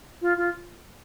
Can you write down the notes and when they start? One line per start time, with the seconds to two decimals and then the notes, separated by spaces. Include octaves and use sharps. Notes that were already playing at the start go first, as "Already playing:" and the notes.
0.22 F4
0.37 F4